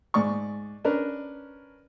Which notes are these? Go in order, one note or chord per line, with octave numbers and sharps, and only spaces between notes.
G#2 D5 C#6
C#4 D4 A#4 B4